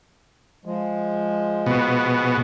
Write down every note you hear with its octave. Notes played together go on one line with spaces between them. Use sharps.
F3 G#3
B2